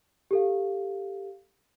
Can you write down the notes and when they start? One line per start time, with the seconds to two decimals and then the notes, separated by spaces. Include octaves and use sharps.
0.31 G4 A4 F5